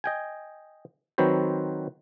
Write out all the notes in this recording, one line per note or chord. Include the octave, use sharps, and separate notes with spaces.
D#5 G5 G#5
D#3 F#3 C4 F#4 B4 C5